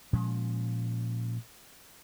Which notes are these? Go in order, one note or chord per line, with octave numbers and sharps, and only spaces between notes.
A#2 F3 G#3 C#4